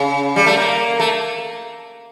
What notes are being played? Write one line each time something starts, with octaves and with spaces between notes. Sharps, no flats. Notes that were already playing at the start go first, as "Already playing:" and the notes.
Already playing: C#3
G3
A3
A#3
A3